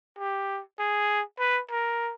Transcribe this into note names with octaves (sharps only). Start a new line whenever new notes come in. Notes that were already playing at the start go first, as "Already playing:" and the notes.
G4
G#4
B4
A#4